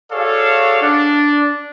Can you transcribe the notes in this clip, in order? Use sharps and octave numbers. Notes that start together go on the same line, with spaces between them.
F#4 G#4 A4 C#5 D5 F5
D4